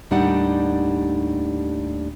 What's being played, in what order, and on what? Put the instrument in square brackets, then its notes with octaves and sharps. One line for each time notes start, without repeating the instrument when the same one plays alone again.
[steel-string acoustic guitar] D#2 A2 G3 D4 D#4 F#5